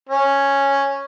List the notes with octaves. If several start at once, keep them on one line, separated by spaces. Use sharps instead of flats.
C#4